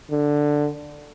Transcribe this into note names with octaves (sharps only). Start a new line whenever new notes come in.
D3